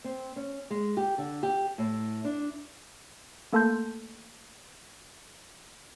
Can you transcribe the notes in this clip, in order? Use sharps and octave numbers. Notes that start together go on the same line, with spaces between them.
C4
C#4
G#3
G4
D3
G4
A2
D4
A3 A#3 A4 A5 C6 G6